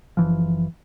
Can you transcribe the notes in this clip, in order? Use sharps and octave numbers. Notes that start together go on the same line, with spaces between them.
F#1 E3 F3